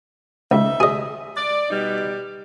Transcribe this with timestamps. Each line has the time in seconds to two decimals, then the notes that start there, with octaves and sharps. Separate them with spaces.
0.51 C#2 D#4 E5
0.80 G#4 D#5
1.36 D5
1.71 B2 G3 D#4